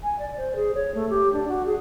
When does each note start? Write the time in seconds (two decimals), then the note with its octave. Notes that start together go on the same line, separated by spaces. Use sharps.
0.03 G#5
0.19 D5
0.37 C5
0.56 G#4
0.75 C#5
0.95 A3
1.09 G4
1.33 D4
1.48 F#4
1.66 G#4